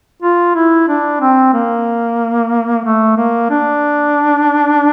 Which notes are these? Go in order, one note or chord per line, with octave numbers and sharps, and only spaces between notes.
F4
E4
D4
C4
A#3
A3
A#3
D4